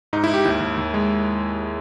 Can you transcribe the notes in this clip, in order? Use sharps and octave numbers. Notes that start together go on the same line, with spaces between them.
G#2 D#4
G#2 E4
G4
D#2 E4
D#2
D#2
G#3